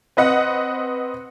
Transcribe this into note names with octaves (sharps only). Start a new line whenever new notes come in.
C4 B4 D#5 F#5